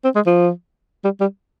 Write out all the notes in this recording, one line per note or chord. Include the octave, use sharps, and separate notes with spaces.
C4
G#3
F3
G3
G3